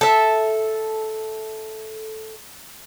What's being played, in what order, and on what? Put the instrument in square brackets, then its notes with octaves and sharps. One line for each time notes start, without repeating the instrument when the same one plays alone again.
[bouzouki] A4 E5